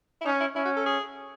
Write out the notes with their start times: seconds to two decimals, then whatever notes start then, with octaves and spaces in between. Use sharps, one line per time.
0.21 E4
0.25 C#4 D#4
0.40 E4
0.56 C#4 E4
0.65 F#4
0.76 A4
0.86 G#4